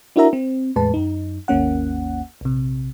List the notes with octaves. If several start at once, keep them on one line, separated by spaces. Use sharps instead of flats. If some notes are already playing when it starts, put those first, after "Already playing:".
D4 E4 F#4 A#4 E5 A#5
C4
E2 A2 G#3 B4 A5
F#2 D#4
G#1 D#2 A#3 C#4 F#5
A#1 C3